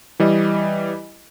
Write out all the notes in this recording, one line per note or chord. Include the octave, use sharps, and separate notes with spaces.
E3 G3 D#5